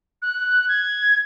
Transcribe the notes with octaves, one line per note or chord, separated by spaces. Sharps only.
F#6
G#6